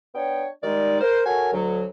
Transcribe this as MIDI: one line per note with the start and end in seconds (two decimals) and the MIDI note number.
0.15 0.46 59
0.15 0.46 62
0.15 0.46 73
0.15 0.46 79
0.63 1.00 51
0.63 1.00 55
0.63 1.00 56
0.63 1.00 63
0.63 1.00 74
1.01 1.22 70
1.01 1.22 72
1.26 1.50 66
1.26 1.50 69
1.26 1.50 70
1.26 1.50 73
1.26 1.50 80
1.53 1.84 38
1.53 1.84 54